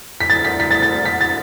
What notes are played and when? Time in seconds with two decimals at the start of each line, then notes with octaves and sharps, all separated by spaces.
0.20 B6
0.30 A6
0.45 B6
0.60 B6
0.71 A6
0.82 A6
1.05 B6
1.21 A6